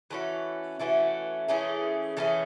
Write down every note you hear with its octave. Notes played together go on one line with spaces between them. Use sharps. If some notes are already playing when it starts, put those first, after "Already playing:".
E3 A3 C#4 F#4
E3 A3 C#4 F#4
E3 A3 C#4 G#4
E3 A3 C#4 G#4